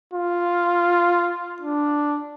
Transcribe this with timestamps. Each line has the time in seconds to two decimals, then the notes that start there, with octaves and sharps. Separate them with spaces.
0.13 F4
1.62 D4